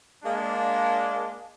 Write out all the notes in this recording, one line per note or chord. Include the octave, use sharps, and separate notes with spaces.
G#3 A#3 D4